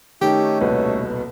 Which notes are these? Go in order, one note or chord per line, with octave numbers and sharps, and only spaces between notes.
D#3 A3 C#4 D#4 G4
D#1 C2 B2 B4